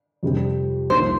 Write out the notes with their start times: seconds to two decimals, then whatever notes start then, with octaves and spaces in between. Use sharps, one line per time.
0.23 F2 C3 G3 C4
0.90 C2 C3 F3 A#3 D#4 C5